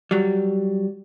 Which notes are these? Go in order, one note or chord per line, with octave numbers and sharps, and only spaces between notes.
F#3 G3